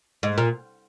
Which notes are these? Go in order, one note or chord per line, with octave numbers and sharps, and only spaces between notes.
G#2
A#2